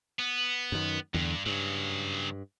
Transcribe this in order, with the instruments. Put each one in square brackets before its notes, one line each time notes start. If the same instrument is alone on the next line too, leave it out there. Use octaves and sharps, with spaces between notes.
[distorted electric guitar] B3
[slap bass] F#2 D#3
[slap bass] E2 D3 [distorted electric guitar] G2
[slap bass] G2 [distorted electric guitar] C#3 F#3